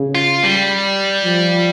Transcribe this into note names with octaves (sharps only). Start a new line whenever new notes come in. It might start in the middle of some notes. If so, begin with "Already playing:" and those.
Already playing: C#3
F4
G3
F3